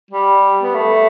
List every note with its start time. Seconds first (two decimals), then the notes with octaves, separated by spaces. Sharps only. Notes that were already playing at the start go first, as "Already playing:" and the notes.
0.11 G3
0.63 B3
0.75 A3